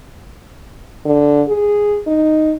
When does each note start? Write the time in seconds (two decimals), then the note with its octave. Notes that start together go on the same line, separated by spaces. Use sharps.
1.06 D3
1.48 G#4
2.07 D#4